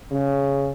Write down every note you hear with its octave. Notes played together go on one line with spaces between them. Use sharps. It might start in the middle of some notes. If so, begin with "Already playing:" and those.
C#3